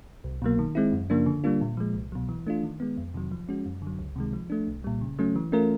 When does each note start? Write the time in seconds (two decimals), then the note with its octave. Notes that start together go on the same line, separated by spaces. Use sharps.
0.24 C2
0.42 B2 F#3 A#3
0.59 D#3
0.75 G#3 C4 E4
0.93 F#2
1.10 C#3 F3 A#3 D4
1.26 D3
1.44 G3 A#3 D4 F4
1.61 A#2
1.77 F3 G#3
1.94 C2
2.12 B2 F#3
2.29 E3
2.47 A3 D4 F4
2.63 D#3
2.80 G#3 B3
2.98 F2
3.14 C3 D#3 F#3
3.32 F3
3.49 G#3 C#4 F#4
3.66 F#2
3.82 D3 F#3
3.99 C#2
4.16 C3 D#3 G#3
4.33 F3
4.50 A3 D4
4.67 C2
4.84 A#2 G3
5.01 C#3
5.19 F#3 A3 C#4
5.36 E3
5.52 A3 C#4 F4 A#4